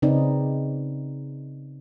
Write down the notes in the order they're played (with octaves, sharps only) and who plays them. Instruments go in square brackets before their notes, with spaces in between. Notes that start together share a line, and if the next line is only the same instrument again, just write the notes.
[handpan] C#3 C4 D#4 B4 D5